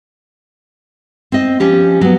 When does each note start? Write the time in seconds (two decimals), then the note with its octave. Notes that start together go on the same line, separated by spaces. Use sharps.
1.32 C4 D#5
1.60 F3 C#4 G4
2.01 F#3 B3